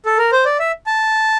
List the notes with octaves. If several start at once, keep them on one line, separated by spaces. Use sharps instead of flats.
A4
A#4
C5
D5
E5
A5